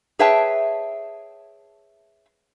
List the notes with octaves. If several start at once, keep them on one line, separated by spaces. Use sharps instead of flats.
G#4 B4 C#5 E5 G5 A5